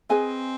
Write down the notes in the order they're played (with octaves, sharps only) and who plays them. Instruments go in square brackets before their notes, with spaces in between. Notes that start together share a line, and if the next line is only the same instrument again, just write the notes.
[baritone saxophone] C4 [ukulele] G#4 B4 D#5 G#5